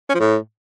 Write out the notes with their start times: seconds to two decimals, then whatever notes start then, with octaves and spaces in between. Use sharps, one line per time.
0.09 C#4
0.15 F3
0.20 A2